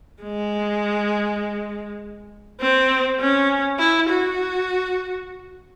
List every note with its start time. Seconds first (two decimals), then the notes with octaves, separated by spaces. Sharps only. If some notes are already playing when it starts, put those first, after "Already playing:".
0.23 G#3
2.60 C4
3.20 C#4
3.79 E4
4.09 F#4